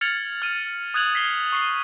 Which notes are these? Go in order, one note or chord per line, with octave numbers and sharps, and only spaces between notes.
F6 G#6 A6 C#7 F7 F#7
F6 D#7
D#6 F#6 G#6 F7 F#7
B6 C7 G7
C#6 C7 G7